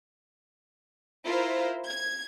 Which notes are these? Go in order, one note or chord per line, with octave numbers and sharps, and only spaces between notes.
E4 F4 A#4 C5
G#6